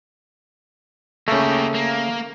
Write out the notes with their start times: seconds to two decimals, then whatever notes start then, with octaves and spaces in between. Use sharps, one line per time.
1.28 C#3 A3 A#3 G4
1.74 A#3